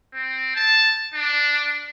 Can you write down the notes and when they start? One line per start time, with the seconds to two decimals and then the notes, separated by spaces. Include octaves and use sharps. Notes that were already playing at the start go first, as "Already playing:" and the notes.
0.14 C4
0.56 A5
1.14 D4